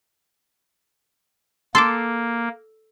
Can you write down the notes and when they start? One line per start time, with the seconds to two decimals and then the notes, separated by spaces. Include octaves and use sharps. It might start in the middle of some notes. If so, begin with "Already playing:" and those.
1.75 A#3 A4 C6 D6